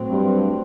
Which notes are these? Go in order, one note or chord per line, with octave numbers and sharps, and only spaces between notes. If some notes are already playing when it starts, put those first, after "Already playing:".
Already playing: A2 F#3 C4
G2